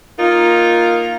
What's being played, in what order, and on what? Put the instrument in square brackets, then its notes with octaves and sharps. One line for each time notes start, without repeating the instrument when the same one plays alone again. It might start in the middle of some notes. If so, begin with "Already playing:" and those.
[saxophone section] A#3 D#4 F4 A#4